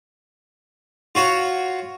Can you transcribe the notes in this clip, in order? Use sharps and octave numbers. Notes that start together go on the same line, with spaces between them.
F4 F#4 C#5